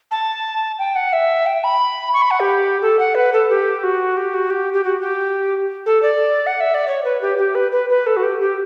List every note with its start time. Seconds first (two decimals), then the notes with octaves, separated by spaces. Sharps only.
0.11 A5
0.79 G5
0.96 F#5
1.13 E5
1.46 G5
1.64 B5
2.13 C#6
2.22 B5
2.31 F#5
2.40 G4
2.82 A4
2.99 F#5
3.15 B4
3.33 A4
3.50 G4
3.83 F#4
4.17 G4
4.34 F#4
4.50 G4
4.73 G4
4.84 F#4
5.01 G4
5.86 A4
6.02 D5
6.46 F#5
6.60 E5
6.74 D5
6.88 C#5
7.04 B4
7.21 G4
7.38 G4
7.55 B4
7.72 B4
7.90 B4
8.06 A4
8.16 F#4
8.23 G4
8.40 G4